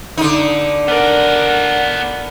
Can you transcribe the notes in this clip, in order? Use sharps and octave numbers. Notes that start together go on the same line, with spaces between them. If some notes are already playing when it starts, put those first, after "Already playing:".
D3 D#4
B3 A#4 D5 F#5